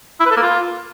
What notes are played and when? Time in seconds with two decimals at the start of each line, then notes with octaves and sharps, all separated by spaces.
0.20 E4
0.26 B4
0.31 A4
0.37 A#3
0.42 F4